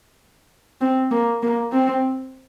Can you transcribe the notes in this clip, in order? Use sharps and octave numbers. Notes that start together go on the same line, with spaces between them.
C4
A#3
A#3
C4